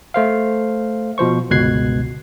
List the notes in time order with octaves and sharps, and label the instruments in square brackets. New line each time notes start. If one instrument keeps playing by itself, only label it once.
[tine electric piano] A3 C5 F5
B2 F3 C5 C#6
G1 C#2 B2 F#6 G#6 C7